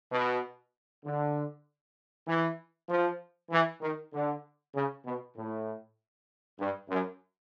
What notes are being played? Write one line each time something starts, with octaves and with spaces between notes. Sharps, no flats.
B2
D3
E3
F3
E3
D#3
D3
C#3
B2
A2
G2
F#2